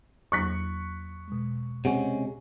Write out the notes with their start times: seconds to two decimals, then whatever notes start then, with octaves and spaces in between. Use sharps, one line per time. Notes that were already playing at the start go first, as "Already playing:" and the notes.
0.32 E2 F#3 A#3 C#6 F#6 B6
1.28 B2 G#3
1.85 C3 G#3 C#4 F#5